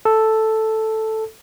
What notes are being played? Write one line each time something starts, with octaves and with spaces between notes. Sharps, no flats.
A4